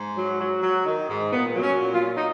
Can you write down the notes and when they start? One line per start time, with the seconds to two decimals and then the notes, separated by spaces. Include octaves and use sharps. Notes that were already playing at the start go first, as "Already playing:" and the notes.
Already playing: G#2
0.16 F#3
0.40 F#3
0.62 F#3
0.85 D#3
1.08 G#2
1.31 A#2 B3
1.54 F#3
1.62 C#4
1.78 A#2
1.93 F4
2.01 F#3
2.16 D#4